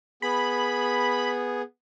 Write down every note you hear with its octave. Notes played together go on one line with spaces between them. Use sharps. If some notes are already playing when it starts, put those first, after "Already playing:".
B3 G#4 B5